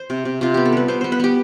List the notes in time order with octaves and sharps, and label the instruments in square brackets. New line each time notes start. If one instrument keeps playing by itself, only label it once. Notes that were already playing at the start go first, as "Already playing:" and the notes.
Already playing: [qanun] C5
C3
C3
C3 F4
B3 G4
A4
G3 B4
B3 C5
B3 C5
B4
B3 G4